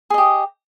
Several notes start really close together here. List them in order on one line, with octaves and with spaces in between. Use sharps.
G#4 D#5 G4